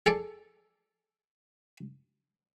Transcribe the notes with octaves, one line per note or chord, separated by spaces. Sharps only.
G#4 A4 D5